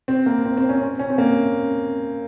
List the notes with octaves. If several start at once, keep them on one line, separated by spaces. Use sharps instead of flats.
C4
A#3
C4
C4
C#4
C4
C#4
C4
A#3